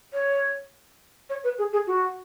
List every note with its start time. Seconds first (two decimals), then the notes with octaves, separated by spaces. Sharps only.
0.13 C#5
1.29 C#5
1.43 B4
1.58 G#4
1.72 G#4
1.87 F#4